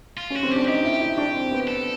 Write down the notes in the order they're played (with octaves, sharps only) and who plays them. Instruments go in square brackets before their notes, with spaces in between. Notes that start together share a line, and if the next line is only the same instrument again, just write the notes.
[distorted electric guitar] F4
[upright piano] C#4
[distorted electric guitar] F#4
[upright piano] C4
[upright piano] D4 [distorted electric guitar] G4
[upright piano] D#4 [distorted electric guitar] G4
[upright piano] E4
E4
D4
C4
B3
[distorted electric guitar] A4